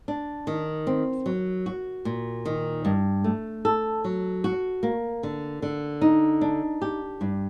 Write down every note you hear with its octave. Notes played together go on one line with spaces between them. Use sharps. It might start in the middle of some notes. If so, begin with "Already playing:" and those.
D4
D#3
C4
F#3
F#4
A#2
D#3
G2
A3
A4
F#3
F#4
A#3
D3
D3
D#4
D4
G4
G2